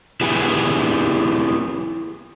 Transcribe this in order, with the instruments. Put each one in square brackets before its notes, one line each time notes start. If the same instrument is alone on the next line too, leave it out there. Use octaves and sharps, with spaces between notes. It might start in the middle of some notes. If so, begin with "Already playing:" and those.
[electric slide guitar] E4 G4 G#4 B4